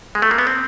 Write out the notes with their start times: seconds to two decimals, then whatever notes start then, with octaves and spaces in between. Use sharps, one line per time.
0.15 G#3
0.22 A3
0.31 A#3
0.38 B3
0.47 C4